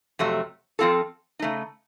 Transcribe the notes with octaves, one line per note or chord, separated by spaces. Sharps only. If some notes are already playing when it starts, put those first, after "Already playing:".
F2 C3 F#3 A3
F3 C4 F4 A4
C#3 A3 D#4